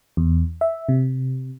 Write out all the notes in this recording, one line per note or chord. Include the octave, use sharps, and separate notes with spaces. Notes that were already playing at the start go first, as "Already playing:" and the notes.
E2
E5
C3